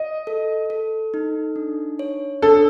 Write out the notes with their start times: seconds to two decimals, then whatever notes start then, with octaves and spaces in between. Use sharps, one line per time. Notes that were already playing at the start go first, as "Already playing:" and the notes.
Already playing: D#5
0.27 A4
0.70 A4
1.14 D#4
1.56 D4
1.99 C#5
2.42 D4 A4